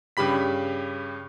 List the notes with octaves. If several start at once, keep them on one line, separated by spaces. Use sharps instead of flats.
G2 C#3 G4 B5 B6